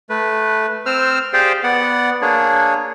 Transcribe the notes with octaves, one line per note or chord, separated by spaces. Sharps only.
A3 B4
C4 C5 E6 F6
G4 G#4 C5 D5 F5 G5
B3 D5 F#5
A#3 D4 G#4 C#5